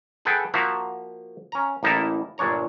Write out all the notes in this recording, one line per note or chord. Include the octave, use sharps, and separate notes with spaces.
G#4 A4 B4 F#5 G5
F3 A#3 F#4 E5 F5
C#4 A#5
A1 A#3 D#4 E4 A5
G1 A#2 D4 C#5 A#5